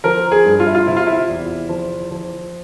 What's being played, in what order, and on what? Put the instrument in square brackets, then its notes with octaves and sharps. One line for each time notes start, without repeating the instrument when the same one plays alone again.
[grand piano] F3 A#4
G#4
G2
F4
E4
F4
C3 E4
F4
E4
E2
F3
F3